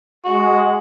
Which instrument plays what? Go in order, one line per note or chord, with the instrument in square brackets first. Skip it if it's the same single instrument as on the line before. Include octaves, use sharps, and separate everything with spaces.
[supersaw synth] G#3 [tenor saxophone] F#4